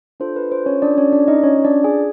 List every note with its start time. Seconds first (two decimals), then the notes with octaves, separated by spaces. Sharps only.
0.20 D4 F4 A4 C5
0.36 B4
0.52 C5
0.66 C#4 C#5
0.82 D4 D5
0.98 C#4 C#5
1.13 D4 D5
1.28 D#4 D#5
1.43 C#4 C#5
1.65 D4 D5
1.84 G#4 G#5